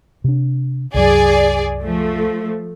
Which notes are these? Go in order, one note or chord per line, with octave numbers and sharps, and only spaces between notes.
C3 D4
C2 F#2 F#3 G#4 D5
F3 A3